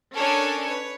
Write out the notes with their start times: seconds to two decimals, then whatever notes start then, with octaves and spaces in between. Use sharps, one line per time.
0.16 C#4 D4 A4 A#4 C#5 G#5
0.66 B4 C#5